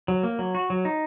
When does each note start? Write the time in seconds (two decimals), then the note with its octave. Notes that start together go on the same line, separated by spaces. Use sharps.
0.08 F#3
0.23 A#3
0.39 F#3
0.55 F#4
0.70 F#3
0.85 D#4